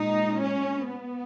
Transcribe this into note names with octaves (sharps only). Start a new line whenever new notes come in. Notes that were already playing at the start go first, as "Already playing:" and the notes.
Already playing: A#2 G#3 D#4
C#4
B3